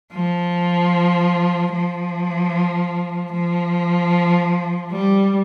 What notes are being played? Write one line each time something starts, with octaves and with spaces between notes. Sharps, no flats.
F3
F3
F3
G3